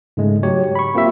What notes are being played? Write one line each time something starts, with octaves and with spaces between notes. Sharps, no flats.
G#2 C#3 G#3 A3
F#3 G4 C#5
B5 C#6
A#3 C4 F4 G4 E5